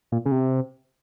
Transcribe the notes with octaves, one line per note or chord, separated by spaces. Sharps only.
A#2
C#3
C3